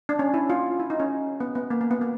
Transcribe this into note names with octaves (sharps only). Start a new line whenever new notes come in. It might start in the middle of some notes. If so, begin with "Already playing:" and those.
D4
C#4
E4
F4
E4
D#4
C#4
B3
B3
A#3
A#3
B3
A#3